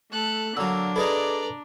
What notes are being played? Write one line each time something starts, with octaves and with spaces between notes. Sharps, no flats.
A3 A4 F#6
D3 F#3 A#3 D4 E6
E4 G#4 A4 B4 D5 D#5 A#5